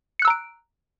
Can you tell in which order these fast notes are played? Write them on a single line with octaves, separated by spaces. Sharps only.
C#7 F#6 E6 A#5 D7